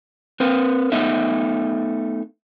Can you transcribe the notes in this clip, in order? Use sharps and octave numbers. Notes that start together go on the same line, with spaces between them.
C4 A#4 B4
A3 B3 D#4 D#5 E5